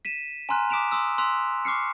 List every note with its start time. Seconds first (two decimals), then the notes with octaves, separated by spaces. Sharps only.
0.05 B6 D#7 E7
0.49 G#5 A#5 C6 F6 F#6
0.70 D6 D#6 B6 D7 E7 F7
0.91 C6 D#6 E6
1.18 C6 E6 F#6 B6 F7
1.65 C#6 D6 F6 C7 C#7